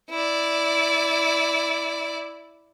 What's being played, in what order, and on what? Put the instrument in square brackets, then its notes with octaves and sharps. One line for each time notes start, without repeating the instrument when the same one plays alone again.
[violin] E4 D5